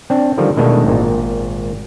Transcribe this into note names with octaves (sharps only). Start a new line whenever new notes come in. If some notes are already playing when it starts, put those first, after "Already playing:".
C4 D4
D3 D#3 F3 G3
B2 D#3 G#3 A3 D4
G#1 A#2